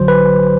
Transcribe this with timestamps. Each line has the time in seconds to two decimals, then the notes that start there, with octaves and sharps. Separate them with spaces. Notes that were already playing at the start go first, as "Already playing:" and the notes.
Already playing: A1 D3 F#3 C5
0.08 B4